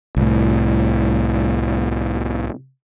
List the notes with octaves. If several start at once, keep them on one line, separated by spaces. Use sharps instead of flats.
C2 A2